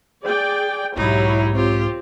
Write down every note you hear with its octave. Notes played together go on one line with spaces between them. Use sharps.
G#4 D5 G5
B1 G#2 F#3 D#4 E4 G4 C#5
C4 F4 G4